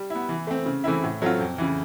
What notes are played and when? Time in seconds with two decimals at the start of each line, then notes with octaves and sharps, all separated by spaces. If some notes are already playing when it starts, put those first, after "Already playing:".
Already playing: G3
0.10 B3 E4
0.29 E3
0.47 A3 C4
0.66 C#3
0.84 E3 A3 C4 E4
1.04 A2
1.22 F#3 A3 C4 F4
1.40 F2
1.58 C#3 E3